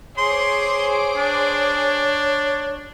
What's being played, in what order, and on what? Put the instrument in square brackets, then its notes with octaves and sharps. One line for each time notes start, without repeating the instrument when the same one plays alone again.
[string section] G#4 C5 D6 [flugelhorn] C#5 [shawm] C6
[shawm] D4